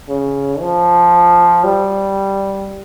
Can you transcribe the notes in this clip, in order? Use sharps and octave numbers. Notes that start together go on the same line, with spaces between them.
C#3
F3
G3